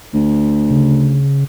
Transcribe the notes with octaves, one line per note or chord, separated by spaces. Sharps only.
D2
C#3